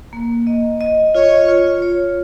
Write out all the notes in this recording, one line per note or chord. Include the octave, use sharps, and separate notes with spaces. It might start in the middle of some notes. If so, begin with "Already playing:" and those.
A#3
D#5
D#5
F4 C#5
F4
C#5